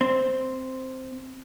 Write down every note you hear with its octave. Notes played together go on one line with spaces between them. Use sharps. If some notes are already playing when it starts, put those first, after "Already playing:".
C4